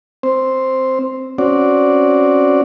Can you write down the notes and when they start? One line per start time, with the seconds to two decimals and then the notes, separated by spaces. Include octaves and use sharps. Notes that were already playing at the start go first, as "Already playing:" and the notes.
0.23 C4 C5
1.38 C4 C#4 F#4 D5